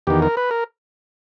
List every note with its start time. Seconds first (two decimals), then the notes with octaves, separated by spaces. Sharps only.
0.07 E2 D#3 G4
0.22 A#4
0.37 B4
0.51 A#4